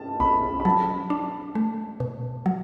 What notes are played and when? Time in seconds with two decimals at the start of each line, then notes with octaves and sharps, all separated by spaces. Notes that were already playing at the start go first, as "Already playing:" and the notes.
Already playing: A5
0.20 B1 B5
0.60 B5
0.65 F#3 A5
1.10 D4
1.55 A3
2.00 B2
2.46 F#3